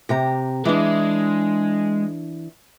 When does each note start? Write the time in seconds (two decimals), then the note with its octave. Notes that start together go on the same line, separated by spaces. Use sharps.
0.09 C3 G4 A#5
0.65 E3 G#3 D4